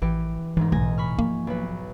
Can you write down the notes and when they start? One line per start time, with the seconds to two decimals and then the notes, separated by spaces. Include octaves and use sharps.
0.02 A1 E3 G4
0.57 E1 G#2 E3 G#3 D#4
0.72 B1 A2 G#5 A#6
0.98 B5 C#6 F6
1.19 F3 A#3
1.47 B1 B4